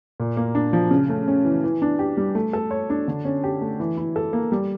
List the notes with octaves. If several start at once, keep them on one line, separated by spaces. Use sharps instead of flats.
A#2
A#3
D4
F3
C#3
A3
C#4
E3
E3
D4
G4
G3
A3
A4
C#5
D4
D3
C#4
G4
A3
E3
E4
A4
A#3
G3